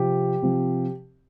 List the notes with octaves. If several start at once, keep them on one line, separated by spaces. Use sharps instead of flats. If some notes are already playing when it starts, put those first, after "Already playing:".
Already playing: C3 F3 C4 G4
C3 F3 C4